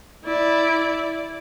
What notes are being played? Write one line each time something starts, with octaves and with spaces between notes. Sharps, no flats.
E4 D5